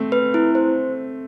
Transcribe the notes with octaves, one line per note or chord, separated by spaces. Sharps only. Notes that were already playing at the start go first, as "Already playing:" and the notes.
Already playing: A3 C4
B4
E4
C5